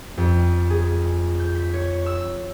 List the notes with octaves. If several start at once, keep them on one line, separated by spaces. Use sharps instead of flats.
F2
G#4
G6
B6
C#5
E6